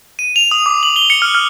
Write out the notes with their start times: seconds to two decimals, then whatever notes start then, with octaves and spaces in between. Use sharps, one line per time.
0.19 D#7
0.36 F7
0.51 D#6
0.66 D6
0.83 F#7
0.96 G7
1.10 C#7
1.22 F6
1.35 F6